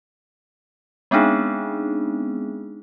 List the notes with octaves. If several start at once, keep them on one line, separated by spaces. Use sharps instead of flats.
G#3 B3 C4 D4 D#4 G#4